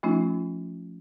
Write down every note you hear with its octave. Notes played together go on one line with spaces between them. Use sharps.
F3 A3 C#4 D#4 F4